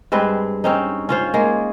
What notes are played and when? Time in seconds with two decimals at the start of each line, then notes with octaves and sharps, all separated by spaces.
0.12 G2 G#3 C4 B4
0.64 C4 C#4 D#4
1.09 C#4 F4 C5
1.34 G#3 A#3 G#4